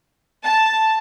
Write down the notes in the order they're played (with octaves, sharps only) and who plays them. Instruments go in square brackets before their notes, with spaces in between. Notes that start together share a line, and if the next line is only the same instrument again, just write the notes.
[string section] A5